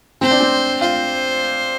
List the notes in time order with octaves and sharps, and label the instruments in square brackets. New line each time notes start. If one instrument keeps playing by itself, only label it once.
[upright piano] C4 [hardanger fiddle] C5
[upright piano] D4
C4
[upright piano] F4 [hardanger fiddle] C5